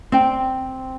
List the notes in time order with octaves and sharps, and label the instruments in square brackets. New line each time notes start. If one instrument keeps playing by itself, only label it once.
[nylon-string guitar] C4 G5